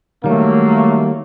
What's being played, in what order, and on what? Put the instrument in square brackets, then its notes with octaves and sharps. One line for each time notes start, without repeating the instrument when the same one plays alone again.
[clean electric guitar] D#3 G3 [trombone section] F#3 A#3 [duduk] A3